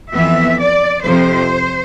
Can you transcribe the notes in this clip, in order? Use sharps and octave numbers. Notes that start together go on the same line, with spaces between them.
F2 E3 B3 E5
D5
F2 C3 F3 C5